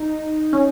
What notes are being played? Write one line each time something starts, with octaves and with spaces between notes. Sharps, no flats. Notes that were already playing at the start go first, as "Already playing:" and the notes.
Already playing: D#4
C#4